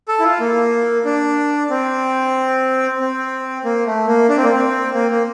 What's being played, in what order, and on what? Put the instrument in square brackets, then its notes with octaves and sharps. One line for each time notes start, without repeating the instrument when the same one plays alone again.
[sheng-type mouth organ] A4
E4
F4
A#3
D4
C4
C4
A#3
A3
A#3
D4
C4
A#3
C4
A#3
A#3